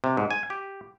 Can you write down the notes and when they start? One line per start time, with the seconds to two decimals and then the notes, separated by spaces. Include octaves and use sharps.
0.04 C3
0.17 G#2
0.31 G#5
0.50 G4